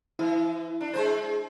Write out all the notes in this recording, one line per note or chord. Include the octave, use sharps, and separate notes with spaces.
E3 E4
D4
G#3 C5